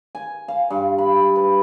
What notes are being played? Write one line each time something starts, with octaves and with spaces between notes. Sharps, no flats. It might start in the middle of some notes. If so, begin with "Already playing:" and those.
G#5
F5
G2
B5
B4